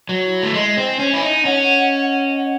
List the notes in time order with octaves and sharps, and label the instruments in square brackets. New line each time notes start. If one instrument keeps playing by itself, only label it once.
[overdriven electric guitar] F#3
[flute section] E4
[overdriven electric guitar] A3
[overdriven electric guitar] G#3 [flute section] D#5
[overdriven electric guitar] C4
[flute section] G#5
[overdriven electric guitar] C#4
[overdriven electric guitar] E4 [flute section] G#5
[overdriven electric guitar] D#4
[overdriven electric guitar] C#4 [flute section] F#5
[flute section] D#5
F#5
F#5